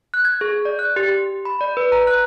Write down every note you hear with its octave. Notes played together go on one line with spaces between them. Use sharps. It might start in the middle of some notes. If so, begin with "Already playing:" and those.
F#6
G#6
G#4
D5
F#6
G4
B5
D5
B4
A#5
F#6